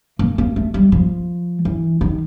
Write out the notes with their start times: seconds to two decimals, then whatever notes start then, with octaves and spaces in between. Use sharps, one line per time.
0.19 A#3
0.38 A#3
0.56 A3
0.74 G3
0.92 F3
1.65 E3
2.01 D#3